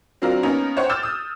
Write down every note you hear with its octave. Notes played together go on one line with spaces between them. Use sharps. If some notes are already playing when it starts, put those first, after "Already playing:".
F#3 C4 D4 F4 A#4
A#3 B3 C#4 D#4 A#4
C5 C#5 F#5 G5
D6 E6 F6 G6 A6 E7
D#6